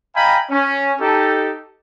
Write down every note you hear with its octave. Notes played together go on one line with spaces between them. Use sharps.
D#5 F5 G5 G#5 A#5 B5
C#4
D#4 G4 A4